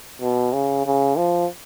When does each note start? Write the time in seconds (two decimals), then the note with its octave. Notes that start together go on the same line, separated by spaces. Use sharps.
0.21 B2
0.53 C#3
0.86 C#3
1.17 F3